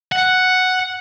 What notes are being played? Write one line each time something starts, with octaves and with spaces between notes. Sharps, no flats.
F#5